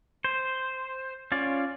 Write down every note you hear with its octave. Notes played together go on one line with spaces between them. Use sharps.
C5
C#4 F4 D5